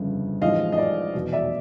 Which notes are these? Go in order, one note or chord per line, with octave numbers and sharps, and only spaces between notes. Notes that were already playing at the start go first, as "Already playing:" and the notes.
Already playing: G1 F2 C#3
A1 G#2 F3 G#3 D#5 F5
D#5
D5
F1 E2 B2
D5 E5